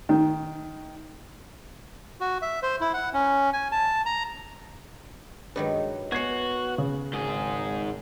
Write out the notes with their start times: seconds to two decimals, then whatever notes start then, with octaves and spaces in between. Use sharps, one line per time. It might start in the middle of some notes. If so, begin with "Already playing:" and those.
0.09 D#3
2.21 F#4
2.42 E5
2.63 C5
2.81 E4
2.94 F#5
3.14 C#4
3.53 G#5
3.72 A5
4.06 A#5
5.56 G2 D#3 F#3 G#3 B4
6.12 B3 F#4 C#5 G#5 G#6 C7
6.78 C#3
7.13 G#1 G#2 G#4